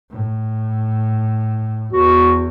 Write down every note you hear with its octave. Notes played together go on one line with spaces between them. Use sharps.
A2
E2 F#4